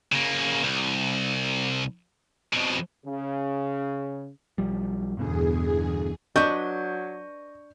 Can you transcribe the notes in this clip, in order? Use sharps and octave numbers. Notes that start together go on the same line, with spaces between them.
C#3 A#3
C2
F2 B2
C#3
B1 F3 G3
E2 G2 B2 D3 G#4
F#3 D4 B4 D#5 C#6 G6